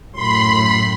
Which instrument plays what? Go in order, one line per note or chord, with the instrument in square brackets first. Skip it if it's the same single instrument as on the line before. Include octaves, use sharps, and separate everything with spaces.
[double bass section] F#2 A2 [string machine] B5 C6